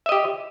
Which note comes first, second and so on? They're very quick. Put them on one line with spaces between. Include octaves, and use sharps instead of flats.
E5 D#5 G4